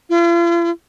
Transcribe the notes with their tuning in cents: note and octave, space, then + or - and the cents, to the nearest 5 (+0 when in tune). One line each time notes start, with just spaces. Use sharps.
F4 -45